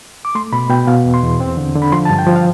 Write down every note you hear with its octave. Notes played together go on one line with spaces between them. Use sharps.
D6
A3 C6
B2 B5
B2 G5
B2 F5
E2
C6
E2
C4
D3
D3
B5
F3 C6
A5
G2
G5
F3
F5